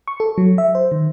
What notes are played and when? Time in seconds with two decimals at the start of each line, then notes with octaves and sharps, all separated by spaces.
0.08 C#6
0.20 A4
0.38 F#3
0.58 E5
0.75 C5
0.92 D#3